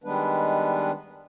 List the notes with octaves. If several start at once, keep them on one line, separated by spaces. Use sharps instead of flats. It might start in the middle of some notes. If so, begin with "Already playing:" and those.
D#3 G3 G#3 B3 D4 B4